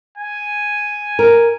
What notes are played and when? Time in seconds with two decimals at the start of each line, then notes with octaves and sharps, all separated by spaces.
0.18 G#5
1.19 A#4